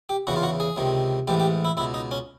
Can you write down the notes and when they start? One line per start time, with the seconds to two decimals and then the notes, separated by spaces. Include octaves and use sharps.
0.09 G4
0.27 E2 C#3 E3 F#4
0.36 F4
0.43 F#4
0.60 G#4
0.76 C#2 C3 D#3
1.28 A1 G#2 E3 G4
1.40 G4
1.65 E4
1.77 C#2 E4
1.80 B2
1.94 D#4
2.11 C#4